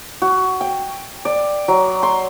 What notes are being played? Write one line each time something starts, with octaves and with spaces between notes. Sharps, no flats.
F#4
G5
D5
F#3
C6